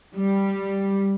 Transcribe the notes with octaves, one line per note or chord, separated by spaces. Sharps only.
G3